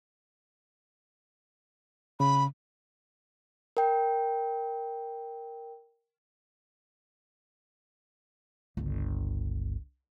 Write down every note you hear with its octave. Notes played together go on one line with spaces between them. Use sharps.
C#3 B5
A#4 G5
G1 C#2